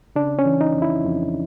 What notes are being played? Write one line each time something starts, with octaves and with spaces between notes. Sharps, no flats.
C#3 D4
C#4
E3
D#4
F2
E4
F2